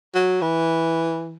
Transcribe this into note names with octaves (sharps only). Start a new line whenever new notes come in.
F#3
E3